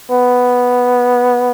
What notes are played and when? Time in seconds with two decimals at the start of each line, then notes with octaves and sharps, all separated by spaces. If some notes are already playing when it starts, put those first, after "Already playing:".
0.11 B3